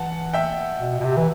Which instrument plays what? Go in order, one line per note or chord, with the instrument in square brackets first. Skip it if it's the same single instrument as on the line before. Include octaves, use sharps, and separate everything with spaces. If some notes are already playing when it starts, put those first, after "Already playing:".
Already playing: [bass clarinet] E3 [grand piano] F#5 A5
[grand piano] E5 G5
[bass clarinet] B2
B2
C3
E3